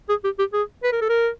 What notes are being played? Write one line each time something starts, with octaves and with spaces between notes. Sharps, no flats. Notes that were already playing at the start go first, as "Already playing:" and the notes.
G#4
G4
G4
G#4
B4
A#4
A4
A#4